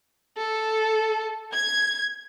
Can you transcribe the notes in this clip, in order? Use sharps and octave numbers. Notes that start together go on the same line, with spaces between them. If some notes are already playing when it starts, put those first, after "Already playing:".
A4
G#6